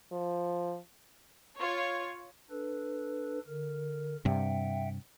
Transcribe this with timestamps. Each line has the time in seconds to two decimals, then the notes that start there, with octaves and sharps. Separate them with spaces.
0.12 F3
1.59 F4 C#5
2.50 D4 A4 B4
3.47 D3 A#4
4.25 G2 C3 E5 F#5 G5